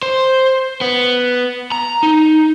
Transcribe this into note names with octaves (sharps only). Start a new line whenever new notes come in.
C5
B3
A#5
D#4